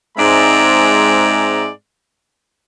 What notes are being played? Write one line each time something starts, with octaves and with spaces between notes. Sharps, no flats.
G#2 G#3 C4 D5 E5 A#5